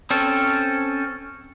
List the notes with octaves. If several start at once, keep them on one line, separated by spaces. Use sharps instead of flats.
C4 C#4 A4